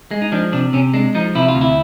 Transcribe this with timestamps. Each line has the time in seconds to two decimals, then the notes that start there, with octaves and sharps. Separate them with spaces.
0.11 G#3
0.22 D#4
0.32 F3 D4
0.52 C3 D4
0.73 C3 C#4
0.94 G#3 D4
1.15 F3 D#4
1.35 C3 E4
1.49 F4
1.55 D2
1.61 E4